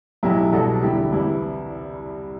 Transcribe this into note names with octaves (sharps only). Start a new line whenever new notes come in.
B1 A2 F#3 E4 G4
C2 B2 F#3 F#4 A4
E2 D3 G3 E4 G4
C2 C3 E3 G3 E4